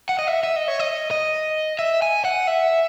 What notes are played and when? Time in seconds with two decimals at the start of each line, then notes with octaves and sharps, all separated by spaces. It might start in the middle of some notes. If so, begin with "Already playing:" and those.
0.09 F#5
0.19 D#5
0.27 E5
0.43 E5
0.56 D#5
0.68 C#5
0.79 D#5
1.11 D#5
1.79 E5
2.02 G#5
2.25 F#5
2.47 E5